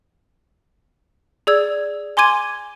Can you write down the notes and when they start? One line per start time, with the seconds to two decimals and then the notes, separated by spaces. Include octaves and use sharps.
1.47 G#4 D5 E6 G#6
2.17 G#5 C6 D6 G#6 D#7